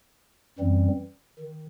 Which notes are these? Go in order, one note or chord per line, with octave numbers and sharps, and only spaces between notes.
F#2 E3 G3 C4
D#3